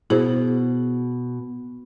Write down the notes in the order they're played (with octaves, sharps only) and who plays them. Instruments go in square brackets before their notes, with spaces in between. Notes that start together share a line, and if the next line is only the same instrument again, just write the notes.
[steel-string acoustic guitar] B2 [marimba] E4 G#4 C5